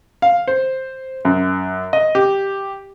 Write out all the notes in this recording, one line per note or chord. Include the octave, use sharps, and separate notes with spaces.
F5
C5
F#2
D#5
G4